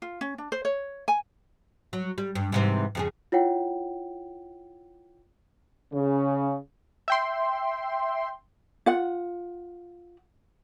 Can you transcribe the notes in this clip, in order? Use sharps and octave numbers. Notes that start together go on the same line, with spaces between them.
F4
C#4
D4
C5
C#5
G#5
F#3
G3
G2
G#2 C3 E3
F2 C#3 G#4
E4 F4 C#5 F#5 G5
C#3
E5 G5 C6
F4 F#5